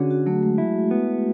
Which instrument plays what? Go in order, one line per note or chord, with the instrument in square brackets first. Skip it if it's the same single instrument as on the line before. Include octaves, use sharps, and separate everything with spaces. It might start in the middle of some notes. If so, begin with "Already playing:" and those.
Already playing: [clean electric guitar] D3 C#4 [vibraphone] F#4 G#4
[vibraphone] F#4
[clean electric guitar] F#3 [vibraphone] A3
[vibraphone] G#3
[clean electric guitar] E4
B3